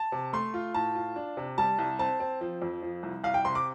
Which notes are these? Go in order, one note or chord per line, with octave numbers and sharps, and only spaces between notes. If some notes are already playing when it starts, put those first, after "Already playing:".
Already playing: A5
C3
A3 C6
F4
A2 A5
F4
D4
C3
G3 A5
C2
C4 A5
C4
F3
F2
F3
C2
C2 F5
G5
C3 C6
D6